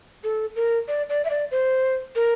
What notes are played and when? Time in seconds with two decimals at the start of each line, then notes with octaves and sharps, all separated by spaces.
0.24 A4
0.56 A#4
0.88 D5
1.09 D5
1.25 E5
1.30 D5
1.51 C5
2.15 A#4